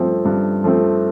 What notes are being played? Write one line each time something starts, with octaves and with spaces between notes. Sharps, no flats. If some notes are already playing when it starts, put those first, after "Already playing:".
Already playing: G2 F3 A3 C4
G2
F3 A3 C4